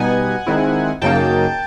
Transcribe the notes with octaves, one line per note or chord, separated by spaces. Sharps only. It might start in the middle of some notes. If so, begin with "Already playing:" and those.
Already playing: B2 G3 B3 D#4 F#5 G#5
D#3 G#3 C4 E4
F#2 C#3 F#3 A#3 D#4 G5 A5